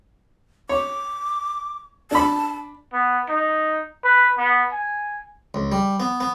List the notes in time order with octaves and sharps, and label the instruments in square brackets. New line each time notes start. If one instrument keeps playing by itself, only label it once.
[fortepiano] C#5 [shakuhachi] D6
[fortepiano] D4 B5 [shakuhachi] A5
[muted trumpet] B3
D#4
B4
B3
G#5
[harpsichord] C#2
G3
B3
B3